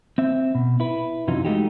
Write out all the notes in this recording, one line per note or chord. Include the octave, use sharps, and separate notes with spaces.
C4 E5
B2
E4 B4
F#2 C3 E3 F#3 D#4 F4
G#3 A3 D#4 F#4 G4